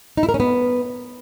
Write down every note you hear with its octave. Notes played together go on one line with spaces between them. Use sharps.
D#4
E4
A#4
C#4
B3